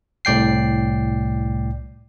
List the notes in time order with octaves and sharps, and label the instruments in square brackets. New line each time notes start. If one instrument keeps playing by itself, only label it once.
[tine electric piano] C2 A2 D5 G5 C7